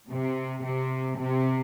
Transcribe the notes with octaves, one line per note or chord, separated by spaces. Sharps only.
C3
C3
C3